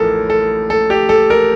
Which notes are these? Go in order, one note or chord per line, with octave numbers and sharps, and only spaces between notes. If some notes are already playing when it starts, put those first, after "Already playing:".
Already playing: A1 A2 F3 A4 A#4
A4
A4
G4
A4
A#4